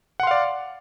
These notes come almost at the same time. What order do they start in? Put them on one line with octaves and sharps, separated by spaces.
F#5 C6 F5 D5